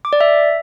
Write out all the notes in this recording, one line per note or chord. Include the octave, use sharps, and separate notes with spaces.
D6
D5
E5